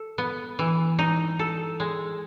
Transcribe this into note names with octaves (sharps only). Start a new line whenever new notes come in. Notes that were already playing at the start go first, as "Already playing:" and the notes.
Already playing: A4
B3
E3
D#4
A4
G#3